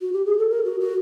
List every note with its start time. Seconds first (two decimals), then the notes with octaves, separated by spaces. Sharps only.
0.01 F#4
0.13 G4
0.25 G#4
0.38 A4
0.50 A#4
0.65 F#4
0.80 F#4